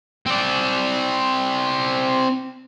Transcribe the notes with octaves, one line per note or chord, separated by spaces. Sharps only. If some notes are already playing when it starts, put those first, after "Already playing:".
C4 D5